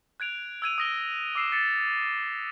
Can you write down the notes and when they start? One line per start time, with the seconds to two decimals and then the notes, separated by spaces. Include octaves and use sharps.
0.20 F#6 G#6 D7 F7
0.62 E6 G#6 D#7 F7
0.78 D#6 A#6 G7
1.35 D6 E6 C7 D#7 E7
1.52 A6 B6 C#7 E7